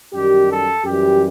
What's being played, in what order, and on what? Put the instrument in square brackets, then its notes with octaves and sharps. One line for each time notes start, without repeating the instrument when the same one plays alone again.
[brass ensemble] F#2 D#3 G3 G4
A4
F#2 E3 G3 G4